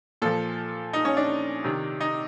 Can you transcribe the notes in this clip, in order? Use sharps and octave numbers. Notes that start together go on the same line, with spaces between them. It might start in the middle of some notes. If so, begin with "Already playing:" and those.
A#2 F3 A4
D#4
C#4
D4
C3 D#3
D#4